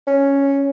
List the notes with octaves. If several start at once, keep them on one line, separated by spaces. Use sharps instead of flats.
C#4